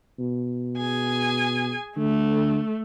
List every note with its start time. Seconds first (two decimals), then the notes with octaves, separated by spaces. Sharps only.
0.19 B2
0.78 G#4 G#5
1.97 D3 A3